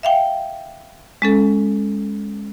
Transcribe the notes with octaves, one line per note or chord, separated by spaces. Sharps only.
E5 F5 G5
G#3 C#4 A4